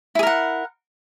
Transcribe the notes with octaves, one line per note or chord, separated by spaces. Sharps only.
E4 G#4 A#4 F#5